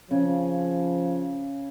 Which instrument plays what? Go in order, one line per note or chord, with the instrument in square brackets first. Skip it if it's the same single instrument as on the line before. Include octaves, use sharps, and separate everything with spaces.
[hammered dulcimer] C#3 [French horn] F3